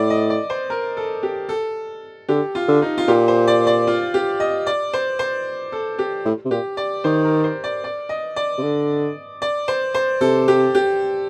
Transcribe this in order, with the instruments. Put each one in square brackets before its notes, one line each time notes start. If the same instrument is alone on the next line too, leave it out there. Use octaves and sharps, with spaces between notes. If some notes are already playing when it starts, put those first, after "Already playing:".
Already playing: [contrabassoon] A2 [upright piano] D5
[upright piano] D#5
D5
C5
A#4
A4
G4
A4
[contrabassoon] D3 [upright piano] G4
[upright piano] F4
[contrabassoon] D3
[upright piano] D#4
F4
[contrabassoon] A#2 [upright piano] G4
[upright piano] C5
D5
D5
F4
G4
D#5
D5
C5
C5
A4
G4
[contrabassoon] A2
C3
[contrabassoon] A#2 [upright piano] G4
[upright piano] D5
[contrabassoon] D#3 [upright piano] C5
[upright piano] A#4
C5
D5
D5
D#5
D5
[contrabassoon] C3
D3
[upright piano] D5
C5
C5
[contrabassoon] C3 [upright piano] A4
[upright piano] G4
G4